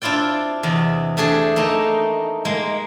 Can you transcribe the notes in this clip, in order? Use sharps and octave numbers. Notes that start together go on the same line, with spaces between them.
C4 D4 E4 F4 D5 G5
E2 C3 D#5
A3 D4 G4 G#4
A3 A#3 D#4
G#3 A#3